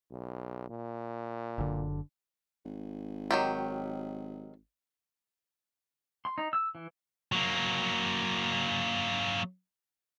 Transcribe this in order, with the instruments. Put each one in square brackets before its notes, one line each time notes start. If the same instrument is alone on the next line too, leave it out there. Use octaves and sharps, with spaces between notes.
[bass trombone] B1
A#2
[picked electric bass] F#1 D3
[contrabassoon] G#1
[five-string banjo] D#3 F#3 G4
[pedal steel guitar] C6
D#4
E6
E3
[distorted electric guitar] F#3 A#3